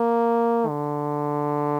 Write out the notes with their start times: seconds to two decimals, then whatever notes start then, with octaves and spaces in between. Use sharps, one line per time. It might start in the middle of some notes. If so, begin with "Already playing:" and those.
Already playing: A#3
0.68 D3